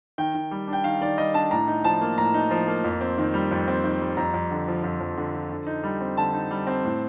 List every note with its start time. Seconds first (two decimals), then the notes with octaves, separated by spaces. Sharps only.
0.18 D#3 G5
0.35 D#3
0.51 G3
0.68 D4 G5
0.84 D#3 F5
1.01 D#3 D5
1.18 G3 D#5
1.34 D4 A5
1.51 A2 A#5
1.68 D#4
1.84 F3 A5
2.01 A#3
2.18 A2 A#5
2.34 D#4
2.51 F3
2.68 A#3
2.84 F2
3.01 C4
3.18 D#3
3.34 G3
3.51 F2
3.68 C4
3.84 D#3
4.00 G3
4.17 F2 A#5
4.34 F2
4.51 D3
4.68 F3
4.84 F2
5.01 F2
5.17 D3
5.34 F3
5.50 D3
5.67 D#4
5.83 G3
6.01 C4
6.17 D3 A5
6.33 D#4
6.51 G3
6.67 C4
6.84 A2